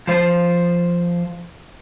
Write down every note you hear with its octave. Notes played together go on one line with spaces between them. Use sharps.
F3 C5